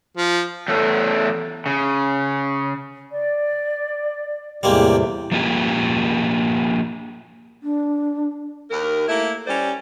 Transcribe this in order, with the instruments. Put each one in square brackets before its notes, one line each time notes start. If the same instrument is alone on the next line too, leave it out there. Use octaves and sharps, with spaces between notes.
[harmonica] F3
[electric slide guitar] E2 A3 A4 C#5
C#3
[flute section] D5
[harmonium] E2 A2 C3 [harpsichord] G3 G#3 A#3 [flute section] G5
[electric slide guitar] F3 A#3 F4 G4
[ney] D4
[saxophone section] D#2 A#4
A3 A#3 E4
G3 C#4 C5 D5